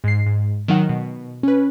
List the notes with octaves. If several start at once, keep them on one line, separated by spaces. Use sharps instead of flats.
G#2 C7
G#2
D#3 F#3 D#4 F#5
B2
C#4 B4